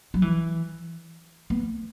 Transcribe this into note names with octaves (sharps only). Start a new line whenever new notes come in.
F#3
E3
B3